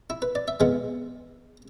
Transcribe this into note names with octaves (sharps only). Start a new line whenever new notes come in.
E4
B4
D5
E5
E2 B2 G#3 B3 F5